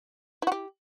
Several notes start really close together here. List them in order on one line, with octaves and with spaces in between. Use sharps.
E4 F#4 G4